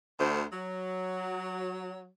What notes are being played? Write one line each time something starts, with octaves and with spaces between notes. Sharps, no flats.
D2 C5
F#3